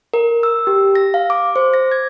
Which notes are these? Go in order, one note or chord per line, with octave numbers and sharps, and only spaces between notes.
A#4
E6
G4
A#6
F5
D6
C5
A#6
G#6